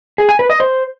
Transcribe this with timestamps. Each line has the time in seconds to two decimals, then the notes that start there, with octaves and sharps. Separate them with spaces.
0.18 G#4
0.29 G#5
0.39 B4
0.50 D#5
0.60 C5